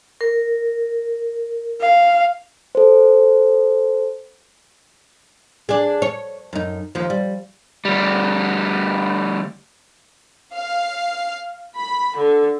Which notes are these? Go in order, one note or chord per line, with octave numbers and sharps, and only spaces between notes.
A#4
F5
A4 C5
D4 G#4
C#5
F#2 D#4
D#2 F3
G3
D2 G3
F5
B5
D3